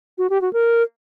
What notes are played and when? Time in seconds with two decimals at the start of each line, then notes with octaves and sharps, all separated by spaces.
0.18 F#4
0.30 G4
0.42 F#4
0.53 A#4